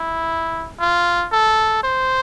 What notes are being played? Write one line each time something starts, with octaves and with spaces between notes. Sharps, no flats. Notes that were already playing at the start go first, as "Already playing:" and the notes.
Already playing: E4
F4
A4
C5